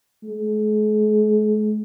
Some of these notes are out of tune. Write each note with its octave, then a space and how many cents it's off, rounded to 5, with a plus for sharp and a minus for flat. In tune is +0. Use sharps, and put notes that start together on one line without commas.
G#3 +45